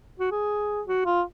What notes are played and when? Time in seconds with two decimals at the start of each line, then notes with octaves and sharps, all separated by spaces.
0.19 F#4
0.31 G#4
0.87 F#4
1.05 F4